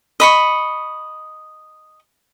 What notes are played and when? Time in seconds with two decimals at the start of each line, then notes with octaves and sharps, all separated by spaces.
0.20 D#5 B5 C#6